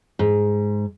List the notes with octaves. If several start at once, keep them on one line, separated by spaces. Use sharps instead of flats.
G#2